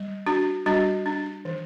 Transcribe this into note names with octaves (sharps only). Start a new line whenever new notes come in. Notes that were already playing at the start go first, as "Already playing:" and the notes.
Already playing: G3
D4 F#4
G3 D4 F#4
D4
E3